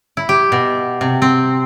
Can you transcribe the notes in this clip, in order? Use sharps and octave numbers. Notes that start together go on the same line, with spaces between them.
E4
G4
B2
C3
C4